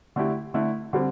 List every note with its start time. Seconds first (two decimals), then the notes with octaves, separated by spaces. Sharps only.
0.16 D3 A3 E4 G4
0.54 D3 A3 E4
0.93 D3 G3 C4